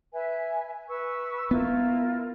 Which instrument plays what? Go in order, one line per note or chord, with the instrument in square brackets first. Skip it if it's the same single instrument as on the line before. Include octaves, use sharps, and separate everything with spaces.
[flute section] B4 E5 G#5
B4 C#6 E6
[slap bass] B3 [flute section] E4 F4 A#4